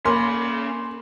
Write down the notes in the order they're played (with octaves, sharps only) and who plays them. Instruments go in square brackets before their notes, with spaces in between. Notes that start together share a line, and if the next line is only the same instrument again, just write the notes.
[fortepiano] A#3 [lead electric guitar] C#4 B5 [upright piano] C6